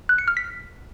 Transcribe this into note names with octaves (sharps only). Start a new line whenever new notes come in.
F#6
C#7
F6
B6